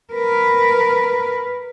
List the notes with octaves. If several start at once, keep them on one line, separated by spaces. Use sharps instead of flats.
A#4 B4